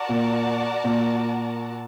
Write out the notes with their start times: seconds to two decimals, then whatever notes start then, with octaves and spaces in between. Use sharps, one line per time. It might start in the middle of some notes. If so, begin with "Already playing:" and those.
Already playing: F#4 A#4 D5 F#5 A5
0.09 A#2
0.84 A#2